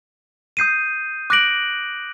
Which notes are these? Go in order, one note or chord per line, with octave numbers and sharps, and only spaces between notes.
D#6 G6 C7 D#7
D6 F#6 A#6 D7 F#7